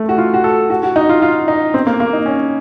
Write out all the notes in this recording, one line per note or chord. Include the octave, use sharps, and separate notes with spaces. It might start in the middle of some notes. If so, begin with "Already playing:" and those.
Already playing: A3
F#4
F4
F#4
A4
F#4
F#4
D#4
F4
F4
D#4
C4
A#3
A#3
D#4
C#4